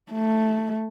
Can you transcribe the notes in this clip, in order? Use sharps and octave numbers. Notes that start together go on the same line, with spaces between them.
A3